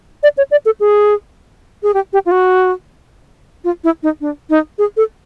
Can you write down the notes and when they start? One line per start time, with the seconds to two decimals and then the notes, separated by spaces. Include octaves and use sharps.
0.23 D5
0.38 C#5
0.51 D5
0.66 A4
0.80 G#4
1.83 G#4
1.94 G4
2.13 G4
2.26 F4
2.31 F#4
3.64 F4
3.84 E4
4.03 D#4
4.21 D4
4.50 D#4
4.78 G#4
4.97 A4